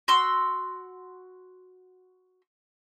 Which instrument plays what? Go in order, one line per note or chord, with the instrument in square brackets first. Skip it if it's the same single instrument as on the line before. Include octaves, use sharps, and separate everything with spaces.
[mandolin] F#4 C6 E6